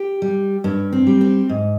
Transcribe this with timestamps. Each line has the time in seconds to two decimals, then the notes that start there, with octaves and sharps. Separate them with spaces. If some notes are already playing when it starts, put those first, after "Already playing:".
Already playing: G4
0.22 G3
0.64 G2 C#4
0.92 C4
1.07 G3
1.21 C4
1.49 G#2